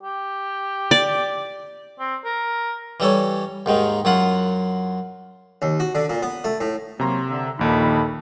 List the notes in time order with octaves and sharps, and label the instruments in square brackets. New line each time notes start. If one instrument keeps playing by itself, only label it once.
[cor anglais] G4
[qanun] D5
[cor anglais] C4
A#4
[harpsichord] E3 G3 A4 C#5
D#2 G#2 D#3
F#2 F#3 F4 F#5
D#2
F#4
D3
A#2
B3
A3
A2
[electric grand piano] C3 A#5 C6 [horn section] F#3 A#3 C#4
[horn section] D3 E5
[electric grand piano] A#1 D#2 A#2 [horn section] D#4 A4 B5